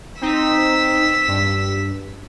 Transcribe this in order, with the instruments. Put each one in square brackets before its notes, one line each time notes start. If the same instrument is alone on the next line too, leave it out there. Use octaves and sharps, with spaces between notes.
[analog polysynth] C4 D#4 [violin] E6 B6
[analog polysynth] G2